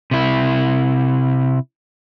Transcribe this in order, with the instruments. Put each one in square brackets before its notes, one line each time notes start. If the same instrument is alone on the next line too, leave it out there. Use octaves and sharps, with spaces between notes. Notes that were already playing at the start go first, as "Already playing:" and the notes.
[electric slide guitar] C3 E4